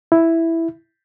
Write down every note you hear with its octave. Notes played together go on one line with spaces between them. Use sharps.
E4